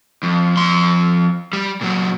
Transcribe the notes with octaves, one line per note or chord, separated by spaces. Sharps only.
F2
F2 C6
G3
A#2 F#3